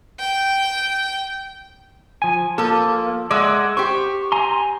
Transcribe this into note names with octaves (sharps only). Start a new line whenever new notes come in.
G5
F3 G#5
F3 A#3 A4
G#3 D5 E5 F#5
G4 C5 C#6
G#5 A#5 C6